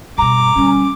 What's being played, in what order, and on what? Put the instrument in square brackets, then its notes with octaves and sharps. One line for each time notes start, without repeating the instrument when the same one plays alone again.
[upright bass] G2 B2 [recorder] A#5 [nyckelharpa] D6
[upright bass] D3 G3 [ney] C#4